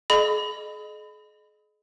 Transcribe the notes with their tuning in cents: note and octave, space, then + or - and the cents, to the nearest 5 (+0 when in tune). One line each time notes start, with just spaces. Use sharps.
G#4 +40 D#5 -30 B5 +25